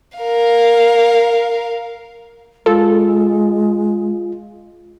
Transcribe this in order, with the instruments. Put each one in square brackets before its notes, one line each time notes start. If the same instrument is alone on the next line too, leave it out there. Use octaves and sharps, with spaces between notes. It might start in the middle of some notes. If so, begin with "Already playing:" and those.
[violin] A#4 F5
[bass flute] G#3 [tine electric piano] F4 [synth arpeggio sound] A4